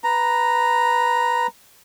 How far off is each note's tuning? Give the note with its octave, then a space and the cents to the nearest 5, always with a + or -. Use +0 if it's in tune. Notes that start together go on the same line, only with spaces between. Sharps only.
B4 +0 A#5 +0